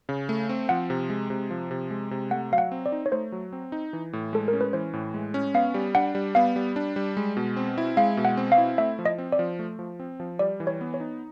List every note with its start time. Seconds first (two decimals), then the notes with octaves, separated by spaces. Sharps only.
0.09 C#3
0.29 A3
0.49 C4
0.69 F3 F#5
0.90 C3
1.10 G#3
1.30 C3
1.50 F3
1.71 C3
1.90 G#3
2.11 C3
2.31 A3 F#5
2.52 F#3 F5
2.58 F#5
2.72 C4
2.86 D5
2.92 D#4
3.06 C#5
3.12 A3 C5
3.32 F#3
3.53 C4
3.72 D#4
3.93 E3
4.13 A2
4.33 G#3 A4
4.48 A#4
4.53 C#4
4.61 B4
4.73 E3 C5
4.93 A2
5.14 G#3
5.34 C#4
5.54 B3 F5
5.74 G3
5.95 D4 F#5
6.15 G3
6.35 B3 F5
6.56 G3
6.76 D4
6.96 G3
7.17 G#3
7.37 B2
7.57 C4
7.78 E4
7.97 G#3 F5
8.17 B2
8.25 F#5
8.37 C4
8.52 F5
8.58 E4
8.78 A3 E5
8.99 F3
9.06 D#5
9.18 C4
9.32 D5
9.39 F3
9.59 A3
9.79 F3
10.00 C4
10.20 F3
10.39 G3 D5
10.60 E3
10.67 C#5
10.81 B3
10.94 C#5
11.00 D#4